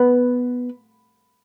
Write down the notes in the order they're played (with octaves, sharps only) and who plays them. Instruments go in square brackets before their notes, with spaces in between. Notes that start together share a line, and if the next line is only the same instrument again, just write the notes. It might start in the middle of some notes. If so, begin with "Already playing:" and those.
Already playing: [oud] B3